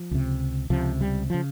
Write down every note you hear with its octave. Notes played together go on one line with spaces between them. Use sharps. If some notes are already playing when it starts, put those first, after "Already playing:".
Already playing: F3
C#2 C3
C#2 C3 F3
G3
C#3 F3